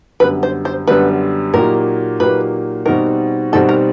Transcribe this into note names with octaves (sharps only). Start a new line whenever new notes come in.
F#2 D3 G3 B3 B4
C5
C5
F#2 D3 G3 B3 B4
A#2 F#3 A#3 D#4 G4 A#4
A#2 F#3 A#3 D#4 G4 B4
B2 G3 C4 D#4 F#4 A#4
B2 G3 C4 D#4 F#4 A4
A#4